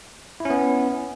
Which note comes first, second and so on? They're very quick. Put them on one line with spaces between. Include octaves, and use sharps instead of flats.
E4 C#4 B3